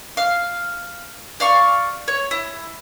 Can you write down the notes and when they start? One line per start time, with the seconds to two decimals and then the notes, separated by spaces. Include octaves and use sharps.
0.17 F5
1.40 D5 F5 C#6
2.08 C#5
2.31 E4